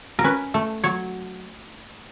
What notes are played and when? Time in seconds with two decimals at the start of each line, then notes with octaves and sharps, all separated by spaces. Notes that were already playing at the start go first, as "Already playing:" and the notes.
0.19 A#4
0.24 C#4 B4
0.54 A3
0.84 F#3 C#5